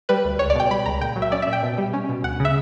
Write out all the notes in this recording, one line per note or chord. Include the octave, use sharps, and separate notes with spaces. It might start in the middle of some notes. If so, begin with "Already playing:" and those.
G3 B4
D2
C#2 C#5
D5
B2 G5
G3 B5
C#2 A#5
A#2 G5
F#3
E5
C#4 D5
E5
A#2
G5
B2
G3
C#4
B2
D2 F#5
C#3 E5